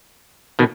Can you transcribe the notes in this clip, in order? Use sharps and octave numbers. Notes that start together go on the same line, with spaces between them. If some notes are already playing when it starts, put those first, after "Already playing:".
B2 D#3